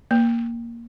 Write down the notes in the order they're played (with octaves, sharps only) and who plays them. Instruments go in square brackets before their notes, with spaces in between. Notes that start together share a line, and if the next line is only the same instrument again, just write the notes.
[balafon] A#3